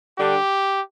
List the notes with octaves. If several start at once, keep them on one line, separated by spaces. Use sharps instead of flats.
D3 G3 D4 G4